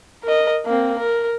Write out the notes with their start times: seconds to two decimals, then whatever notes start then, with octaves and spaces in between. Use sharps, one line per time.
0.24 A#4 D#5
0.66 A#3 C4
0.98 A#4